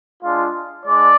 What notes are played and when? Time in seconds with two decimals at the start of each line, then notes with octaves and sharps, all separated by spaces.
0.23 G#3 D4 F4
0.86 G#3 D4 D5